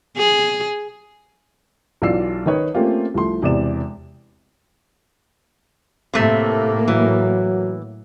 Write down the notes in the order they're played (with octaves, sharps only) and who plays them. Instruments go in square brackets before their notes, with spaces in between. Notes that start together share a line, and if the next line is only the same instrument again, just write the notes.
[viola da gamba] G#4
[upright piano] B1 E3 F4 D5 E6 C7
D#3 D#4 B4 C#5
A3 A#3 C4 C#4 F4 G4
C2 F3 A3 C6
E1 E2 C3 D5 E7
[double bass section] A2 A#3 [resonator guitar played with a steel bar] C3 A3
[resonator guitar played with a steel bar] E3 [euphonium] F#3